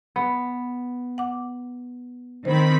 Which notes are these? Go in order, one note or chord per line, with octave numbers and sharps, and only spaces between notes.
B3
F#5 D6
D#3 C4 C5 B5